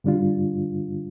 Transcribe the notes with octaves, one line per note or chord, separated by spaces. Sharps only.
G2 D3 G3 D4 F4